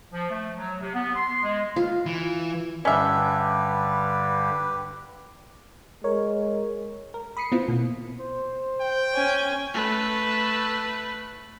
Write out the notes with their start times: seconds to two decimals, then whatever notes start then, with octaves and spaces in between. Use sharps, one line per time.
0.12 F3
0.31 A3
0.56 F#3
0.81 C3
0.94 B3
1.15 C6
1.42 G#3
1.76 F4
2.06 E3
2.85 G2 D3 G3 C#4 G4 B4 E5
6.04 G#3 A#4 C#5
7.14 A#4
7.37 B5 D#6 C7 C#7
7.52 B3 C4 E4 F4
7.68 B2 A#3
8.19 C5
8.81 G5
9.14 C#4 G#5
9.74 A3 B4